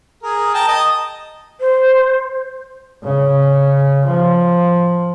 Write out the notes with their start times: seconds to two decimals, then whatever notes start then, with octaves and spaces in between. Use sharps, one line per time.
0.23 G#4 A#4
0.54 G5 A5 A#5
0.68 D#5 D#6
1.60 C5
3.04 C#3
4.07 F3